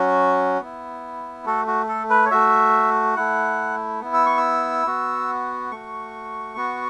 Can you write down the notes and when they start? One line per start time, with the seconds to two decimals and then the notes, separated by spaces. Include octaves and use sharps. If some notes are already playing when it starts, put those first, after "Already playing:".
Already playing: F#3 C#4 F#4
0.60 B3 E4
1.45 A3 F#4 A4
1.67 F#4
1.88 A4
2.10 B4
2.26 C#5
2.31 A3 F#4 E5
3.16 A3 E4 F#5
4.01 B3 E4
4.14 E6
4.26 C#6
4.37 E6
4.87 B3 F#4
5.71 A3 F#4 C#6
6.56 B3 F#4